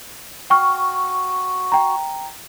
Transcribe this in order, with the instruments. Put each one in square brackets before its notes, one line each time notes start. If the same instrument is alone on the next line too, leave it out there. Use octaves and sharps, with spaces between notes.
[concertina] F#4 [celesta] G5 C#6 F6
[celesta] G5 A#5